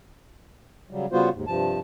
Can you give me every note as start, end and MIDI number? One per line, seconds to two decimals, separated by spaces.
0.91 1.06 49
0.91 1.06 54
0.91 1.06 55
1.12 1.29 49
1.12 1.29 55
1.12 1.29 59
1.12 1.29 65
1.12 1.29 66
1.12 1.29 72
1.33 1.45 39
1.33 1.45 44
1.47 1.79 43
1.47 1.79 48
1.47 1.79 53
1.47 1.79 81